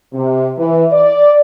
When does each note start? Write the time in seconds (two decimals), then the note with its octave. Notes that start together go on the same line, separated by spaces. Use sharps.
0.12 C3
0.57 E3
0.92 D5